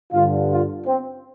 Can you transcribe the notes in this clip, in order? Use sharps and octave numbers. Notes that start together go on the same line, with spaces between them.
G2 D3 F4
F4
C4